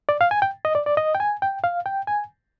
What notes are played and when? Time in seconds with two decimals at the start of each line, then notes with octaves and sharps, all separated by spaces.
0.09 D5
0.21 F5
0.31 G#5
0.42 G5
0.65 D#5
0.75 D5
0.86 D5
0.97 D#5
1.15 G5
1.20 G#5
1.42 G5
1.64 F5
1.86 G5
2.07 G#5